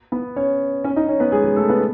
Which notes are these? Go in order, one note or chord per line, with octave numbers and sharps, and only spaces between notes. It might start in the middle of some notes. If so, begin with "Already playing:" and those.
B3 B4
C#4 C#5
C#4 C#5
D#4 D#5
C#4 C#5
B3 B4
G#3 G#4
G#3 G#4
A3 A4
B3 B4